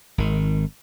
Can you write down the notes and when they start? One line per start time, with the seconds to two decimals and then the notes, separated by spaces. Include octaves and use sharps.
0.18 G#1 D#3